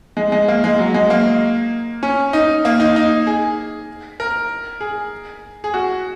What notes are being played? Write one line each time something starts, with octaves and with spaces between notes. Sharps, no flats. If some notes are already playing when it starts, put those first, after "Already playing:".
G#3
G#3
A#3
G#3
F#3
G#3
A#3
C#4
D#4
A#3
D#4
D#4
G#4
A#4
G#4
G#4
F#4